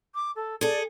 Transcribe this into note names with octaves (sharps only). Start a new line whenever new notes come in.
D6
A4
G#4 A4 D5